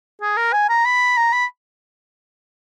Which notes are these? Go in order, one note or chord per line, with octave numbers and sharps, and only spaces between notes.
G#4
A#4
G#5
A#5
B5
A#5
B5